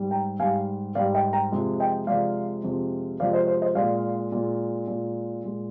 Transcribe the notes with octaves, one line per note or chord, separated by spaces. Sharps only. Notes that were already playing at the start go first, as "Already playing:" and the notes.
Already playing: G#2 G3
G5 A#5
G#2 G3 F5 G#5
G#2 G3 D5 F5
D#5 G5
G5 A#5
F2 C3 F3 G#3
D#5 G5
F2 C3 F3 G#3 D5 F5
F2 C3 F3 G#3
F2 C3 F3 G#3 D5 F5
C5 D#5
C5
C5 D#5
A#2 G#3 D5 F5
A#2 G#3
A#2 G#3
A#2 G#3